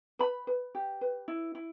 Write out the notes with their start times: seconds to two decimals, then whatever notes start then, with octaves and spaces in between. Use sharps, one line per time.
0.19 B4 B5
0.47 B4
0.75 G4
1.01 B4
1.28 E4
1.55 E4